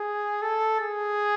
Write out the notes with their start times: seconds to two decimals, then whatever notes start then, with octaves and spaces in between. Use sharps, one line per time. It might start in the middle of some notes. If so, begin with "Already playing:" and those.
Already playing: G#4
0.42 A4
0.80 G#4